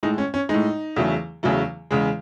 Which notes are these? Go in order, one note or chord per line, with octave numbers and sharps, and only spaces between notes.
A2 G#3 D#4
C#4
C#4
A2 G#3 D#4
E2 C#3 F#3 A3
E2 C#3 F#3 A3
E2 C#3 G#3